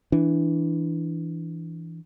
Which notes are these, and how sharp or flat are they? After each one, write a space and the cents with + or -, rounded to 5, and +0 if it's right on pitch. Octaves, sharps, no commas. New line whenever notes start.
E3 +0 D4 +0